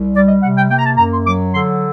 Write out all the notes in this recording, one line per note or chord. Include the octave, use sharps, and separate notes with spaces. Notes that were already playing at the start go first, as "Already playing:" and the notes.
Already playing: C2
G3 D5
D#5
C3 F#5
G5
A#3 G5
A#5
A5
F#2 A#5
C6
F#3 D6
D3 C6